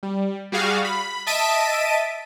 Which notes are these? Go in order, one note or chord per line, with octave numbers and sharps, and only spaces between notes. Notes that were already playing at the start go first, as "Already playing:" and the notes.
G3
G3 F#4 G#4 F5
B5
D#5 E5 A5 B6 D7 D#7